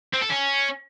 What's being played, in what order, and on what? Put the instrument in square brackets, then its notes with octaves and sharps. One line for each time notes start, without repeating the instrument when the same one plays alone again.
[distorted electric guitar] C4
A4
C#4